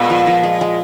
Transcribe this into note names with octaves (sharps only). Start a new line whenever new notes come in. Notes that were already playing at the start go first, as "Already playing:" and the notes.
Already playing: A#2 G#3 B3
F3
F3
G#3
G#3